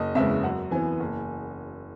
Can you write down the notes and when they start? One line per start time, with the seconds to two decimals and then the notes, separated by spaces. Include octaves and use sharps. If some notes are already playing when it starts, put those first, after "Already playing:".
Already playing: F#1 D#5
0.15 E2 C#3 G#3 B3 E5
0.43 F#2 F#5
0.71 E3 B3 G#5
1.00 F#1